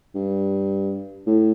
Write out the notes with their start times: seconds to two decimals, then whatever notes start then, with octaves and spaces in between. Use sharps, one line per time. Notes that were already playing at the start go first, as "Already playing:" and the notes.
0.15 G2
1.27 A2